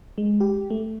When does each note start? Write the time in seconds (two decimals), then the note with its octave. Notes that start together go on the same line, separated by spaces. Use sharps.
0.18 G#3
0.40 G4
0.70 A3